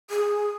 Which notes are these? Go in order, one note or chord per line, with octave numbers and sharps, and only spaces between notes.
G#4